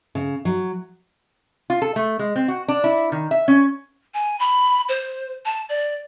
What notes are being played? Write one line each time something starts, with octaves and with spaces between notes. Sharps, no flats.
C#3
F#3
F4
A4
A3
G#3
C4
F#4
D4
E4
D#3
E5
C#4
G#5
B5
C5
A5
D5